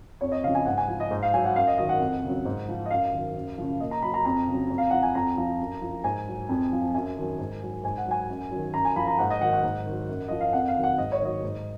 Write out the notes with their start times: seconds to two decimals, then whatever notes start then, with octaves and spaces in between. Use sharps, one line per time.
0.21 F2 C#5
0.32 D#5
0.44 C#3 F3 F5
0.55 G#5
0.66 G#2 F#5
0.77 G#5
0.88 F3
1.00 D#5
1.11 G#2
1.22 F5
1.34 F#3 G#5
1.45 F#5
1.55 F#2 F5
1.67 D#5
1.78 D#3 F#3 D#5
1.89 F#5
2.00 F2
2.23 C#3
2.28 F#3
2.45 G#2
2.68 F3
2.86 D#5
2.91 F#2 F5
3.13 D#3 F#3
3.35 F#2
3.58 C#3 F3
3.79 A#2 D#5
3.91 A#5
4.02 F#3 B5
4.14 A#5
4.25 F2 A#5
4.47 C#3 F#3
4.70 F2
4.78 F5
4.90 F3 F#5
5.03 G#5
5.15 F2 A#5
5.38 F3
5.60 F#2
5.82 F3
6.04 G#2 G#5
6.27 F#3
6.49 F2
6.72 F3
6.94 F#2 G#5
7.17 D#3 F#3
7.38 G#2
7.62 F#3
7.83 G#2 G#5
7.97 F#5
8.06 F#3 G#5
8.29 F#2
8.51 F#3
8.56 D#3
8.74 F#2 A#5
8.85 G#5
8.96 F3 B5
9.07 A#5
9.18 G#2 F#5
9.30 D#5
9.41 D#3 F#3 F#5
9.53 F#5
9.63 G#2
9.86 D#3 F#3
10.09 F#2
10.28 F3 D#5
10.41 F5
10.53 F2 F#5
10.68 F5
10.76 D#3 F#3
10.83 F#5
10.98 G#2 D#5
11.12 C#5
11.21 D#3 F#3 D#5
11.44 G#2